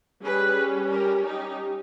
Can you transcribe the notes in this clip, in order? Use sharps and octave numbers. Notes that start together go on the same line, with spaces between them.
G3 C#4 G#4 B4
G4 A#4
D#4 G4